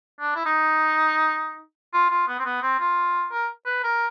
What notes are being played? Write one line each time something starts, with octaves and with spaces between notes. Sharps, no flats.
D4
E4
D#4
F4
F4
B3
C4
B3
C4
F4
A#4
B4
A#4